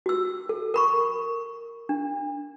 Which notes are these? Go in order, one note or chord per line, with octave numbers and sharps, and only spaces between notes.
F#4 E6
A4
A#4 B5 C#6
D4